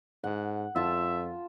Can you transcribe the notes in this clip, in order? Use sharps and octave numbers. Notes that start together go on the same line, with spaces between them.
G#2 F#5
F2 F4 E5 A5